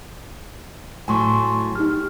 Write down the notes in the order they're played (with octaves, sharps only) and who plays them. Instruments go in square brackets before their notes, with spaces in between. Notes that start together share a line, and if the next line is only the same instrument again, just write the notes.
[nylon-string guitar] A2 F#3 [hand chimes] G#5 C6 C#6
[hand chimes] D#4 G4 F6